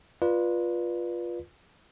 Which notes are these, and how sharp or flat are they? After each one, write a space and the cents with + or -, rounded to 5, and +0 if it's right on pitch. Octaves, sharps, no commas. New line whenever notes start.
F4 +0 B4 -20 D5 +15